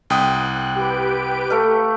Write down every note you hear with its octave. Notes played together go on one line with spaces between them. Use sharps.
C2 G5 D#6 F#6
G4 B4 D7
A3 F5